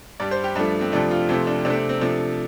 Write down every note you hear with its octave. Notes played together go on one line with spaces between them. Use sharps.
G2 G3 D5
C5
G4
G2 F3 A3 D4
C4
F2 C3 F3 A3 D4
F4
F2 C3 A3 F4
D4
C3 D4
A3 C4
C4
C3 F3 A3 D4